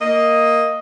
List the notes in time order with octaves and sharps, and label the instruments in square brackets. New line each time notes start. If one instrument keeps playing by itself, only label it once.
[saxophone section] A#3 D#5